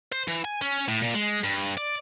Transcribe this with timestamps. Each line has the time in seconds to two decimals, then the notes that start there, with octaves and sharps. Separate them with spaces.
0.12 C5
0.28 E3
0.45 G#5
0.62 C#4
0.88 A2
1.02 A#2
1.14 G#3
1.44 G2
1.78 D5